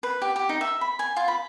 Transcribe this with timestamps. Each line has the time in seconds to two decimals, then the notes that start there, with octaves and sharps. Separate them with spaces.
0.03 B4
0.22 G4
0.36 G4
0.49 D#4
0.61 E5
0.81 B5
0.99 G#5
1.16 F4
1.28 B5